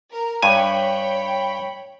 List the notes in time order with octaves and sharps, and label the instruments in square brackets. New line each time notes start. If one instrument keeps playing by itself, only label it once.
[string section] A#4
[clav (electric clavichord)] G2 G#5 [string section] C#5 G5 B5